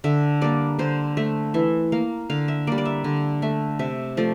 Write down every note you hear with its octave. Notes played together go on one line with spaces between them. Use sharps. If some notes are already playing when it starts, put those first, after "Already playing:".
D3 E5
G3 A#3 D5
D3 C5
A3 E5
E3 E5
A#3 F5
D3 F5
E5
G3 A#3 D5
D5
E5
D3
A3 E5
C3 E5
F3 A3 D5